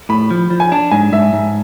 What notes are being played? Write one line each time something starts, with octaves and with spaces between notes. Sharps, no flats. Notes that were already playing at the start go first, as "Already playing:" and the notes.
A2 B5
F3
F3
G#5
D4 A5
G#2 G#5
G#2 E5
G#2